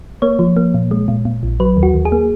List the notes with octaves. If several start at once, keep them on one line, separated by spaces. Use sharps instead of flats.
A#3 C#5
F3
A#3
A#2
G#3
A#2
A#2
A#1
F#3 B4
D#2
F#4
D#2
G#4
A#3